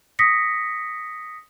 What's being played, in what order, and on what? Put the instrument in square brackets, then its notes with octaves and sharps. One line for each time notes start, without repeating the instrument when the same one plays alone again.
[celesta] D#6 A#6 B6 C#7